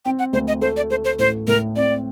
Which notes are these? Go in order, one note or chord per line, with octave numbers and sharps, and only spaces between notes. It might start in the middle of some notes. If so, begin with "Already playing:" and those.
C4 G5
F#5
D2 C5
D#5
A3 C5
D5
A3 C5
C5
A1 C5
A2 A#4
C4 D5